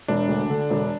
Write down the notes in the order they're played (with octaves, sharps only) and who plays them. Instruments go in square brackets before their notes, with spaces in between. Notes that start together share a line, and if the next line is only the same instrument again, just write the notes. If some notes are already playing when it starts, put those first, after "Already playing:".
[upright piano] E1 [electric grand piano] D4
[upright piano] D2
D3
E1